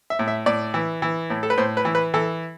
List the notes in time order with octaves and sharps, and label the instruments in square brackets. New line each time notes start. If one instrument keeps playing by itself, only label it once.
[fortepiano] E5
A2
E5
A2 D5
E3
E3
A2
A4
B4
A2 C5
B4
E3
B4
E3 A4